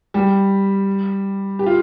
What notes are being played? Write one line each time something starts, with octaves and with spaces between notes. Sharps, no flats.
G3 G4
G4
F4